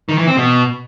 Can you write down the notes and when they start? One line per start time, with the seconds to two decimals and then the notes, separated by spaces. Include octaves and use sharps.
0.09 D#3
0.18 E3
0.27 C4
0.37 B2